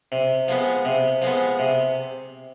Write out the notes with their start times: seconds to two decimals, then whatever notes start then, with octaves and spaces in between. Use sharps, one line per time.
0.12 C3
0.48 F3 G#3 B3
0.85 C3
1.22 F3 G#3 B3
1.59 C3